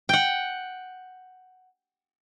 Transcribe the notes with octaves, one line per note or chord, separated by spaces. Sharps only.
F#5 G5